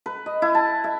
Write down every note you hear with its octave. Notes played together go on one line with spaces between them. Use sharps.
B4
D#5
E4
A5
E5